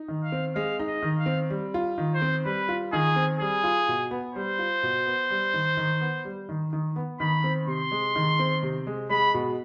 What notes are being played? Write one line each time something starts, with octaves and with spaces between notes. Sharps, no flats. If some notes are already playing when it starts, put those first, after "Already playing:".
Already playing: D#4
D#3
F5
C4
G#3 F5
D#4
D#5
D#3
F5
C4
G3
F4
D#3
C5
C4
G3 B4
F4
D#3 G#4
C4
G3 G#4
F4
B2
B3
G3 C5
F4
B2
B3
G3
D#3
D#3
B3
G3
D#3
D#3
B3
D#3 B5
C4
C3 C6
G#3
D#3
C4
C3
G#3
G#3 B5
B2